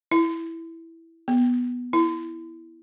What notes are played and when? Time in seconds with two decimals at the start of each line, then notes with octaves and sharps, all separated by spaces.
0.11 E4
1.28 B3
1.93 E4